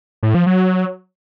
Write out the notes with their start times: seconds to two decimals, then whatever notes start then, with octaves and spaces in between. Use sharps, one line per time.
0.23 A2
0.34 F3
0.46 F#3